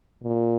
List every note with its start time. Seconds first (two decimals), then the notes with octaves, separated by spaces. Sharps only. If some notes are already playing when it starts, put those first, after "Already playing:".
0.23 A#2